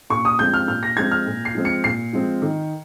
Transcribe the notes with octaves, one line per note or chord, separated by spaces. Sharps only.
A#2 C#6
D#6
F3 G#3 C4 G6
F6
A#2 F6
A#6
F3 G#3 C4 G#6
F6
A#2
C7
F3 G#3 C4
C#7
A#2 C7
F3 G#3 C4
D#3